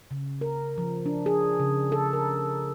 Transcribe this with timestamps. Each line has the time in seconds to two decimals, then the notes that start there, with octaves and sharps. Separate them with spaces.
0.11 C#3
0.41 A#4
0.78 F3
1.06 D4
1.26 G#4
1.60 C#3
1.92 A4
2.13 A#4